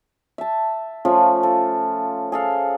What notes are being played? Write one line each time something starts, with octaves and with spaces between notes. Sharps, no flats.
E5 A5
F3 A3 C#4 F4
A4
G#4 A4 F5